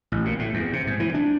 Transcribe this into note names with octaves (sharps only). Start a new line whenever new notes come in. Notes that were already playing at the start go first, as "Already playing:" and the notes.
A1
A#2
A2
E2
C3
G#2
E3
D4